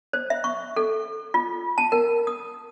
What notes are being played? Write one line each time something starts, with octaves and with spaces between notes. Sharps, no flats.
C5
E5
C#6
A4
F4
A5
A#4
D#6